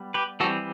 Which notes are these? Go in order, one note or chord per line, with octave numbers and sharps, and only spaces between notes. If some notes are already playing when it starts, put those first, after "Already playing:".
Already playing: G3 B3
G4 B4
E3 G3 C4 F#4 A4